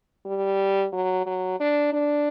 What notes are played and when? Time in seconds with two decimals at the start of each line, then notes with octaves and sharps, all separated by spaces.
0.26 G3
0.93 F#3
1.26 F#3
1.60 D4
1.93 D4